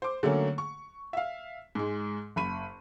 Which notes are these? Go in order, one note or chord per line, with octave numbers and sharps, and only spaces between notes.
C5 D6
D3 F#3 A3 A#3 C#4
C#6
E5 F5
G#2 G#3
F#1 B5 D#7